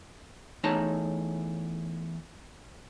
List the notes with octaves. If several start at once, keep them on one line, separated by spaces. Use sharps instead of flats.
E2 A3 D#4 C#5 A5 A#5